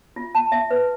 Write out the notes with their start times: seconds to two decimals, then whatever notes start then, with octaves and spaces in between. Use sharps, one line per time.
0.16 F4
0.35 A5
0.52 E5
0.71 B4